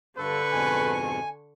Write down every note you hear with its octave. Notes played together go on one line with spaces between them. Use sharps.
G2 D3 A4 B4 C#6
F2 G#2 B2 G#5